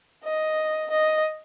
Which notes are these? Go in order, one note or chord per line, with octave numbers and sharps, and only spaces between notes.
D#5
D#5